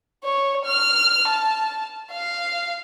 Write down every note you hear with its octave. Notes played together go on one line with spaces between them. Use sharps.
C#5
F6
A5
F5